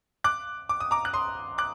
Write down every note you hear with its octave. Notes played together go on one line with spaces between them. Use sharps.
D6 F#6
D6
D#6
A#5 D6
F#6
C6 D#6
D6 F#6